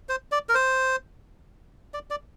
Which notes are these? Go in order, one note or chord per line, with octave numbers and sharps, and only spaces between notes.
C5
D5
A#4
C5
D5
D5